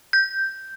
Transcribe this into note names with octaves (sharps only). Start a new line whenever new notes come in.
G6